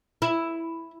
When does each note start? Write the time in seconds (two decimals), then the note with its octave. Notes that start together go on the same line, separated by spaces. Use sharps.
0.22 E4